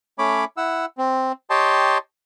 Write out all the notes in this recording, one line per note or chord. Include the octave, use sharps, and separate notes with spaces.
A3 C#4 C#5 B5 D6
E4 F#5 E6
C4
G4 C#5 D#5 G5 A5 C6